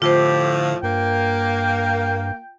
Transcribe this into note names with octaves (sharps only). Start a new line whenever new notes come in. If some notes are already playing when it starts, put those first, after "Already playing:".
A2 D3 F3 F4 G4 C5
G2 A#3 G5